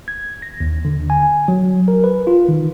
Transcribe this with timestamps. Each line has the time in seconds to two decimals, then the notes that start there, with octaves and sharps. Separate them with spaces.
0.08 G#6
0.42 A#6
0.60 D#2
0.85 D3
1.10 G#5
1.48 F#3
1.88 A#4
2.04 B4
2.27 F4
2.49 D#3